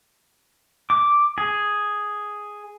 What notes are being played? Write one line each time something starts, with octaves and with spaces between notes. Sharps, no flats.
D6
G#4